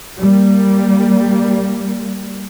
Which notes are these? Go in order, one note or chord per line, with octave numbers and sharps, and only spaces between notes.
G3 A#3